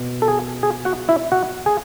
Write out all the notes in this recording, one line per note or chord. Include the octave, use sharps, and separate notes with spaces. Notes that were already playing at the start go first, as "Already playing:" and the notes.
Already playing: B2
A4
G#4
G#4
F#4 F#5
E4 E5
F#4 F#5
G#4 G#5